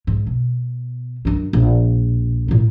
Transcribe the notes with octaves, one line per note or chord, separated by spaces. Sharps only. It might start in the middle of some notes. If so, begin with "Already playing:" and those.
G#2
B2
F#2 D4
A#1
A2 D#4